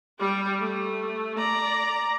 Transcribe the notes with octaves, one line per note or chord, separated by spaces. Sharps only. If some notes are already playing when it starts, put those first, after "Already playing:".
G3 G4
A3
D5 A#5